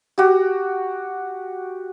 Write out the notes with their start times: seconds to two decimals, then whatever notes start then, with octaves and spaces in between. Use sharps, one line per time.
0.18 F#4 G4